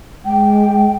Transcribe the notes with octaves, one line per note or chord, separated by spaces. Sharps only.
G#3 G5